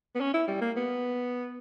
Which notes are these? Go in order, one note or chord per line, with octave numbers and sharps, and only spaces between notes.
B3
C#4
E4
G3
A#3
B3